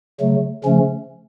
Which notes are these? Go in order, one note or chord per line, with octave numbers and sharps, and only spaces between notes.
C#3 F#3 A3
C#3 F3 A3 C#4